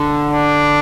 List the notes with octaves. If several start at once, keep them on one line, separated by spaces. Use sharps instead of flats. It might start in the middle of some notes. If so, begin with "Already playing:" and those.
Already playing: D3
D4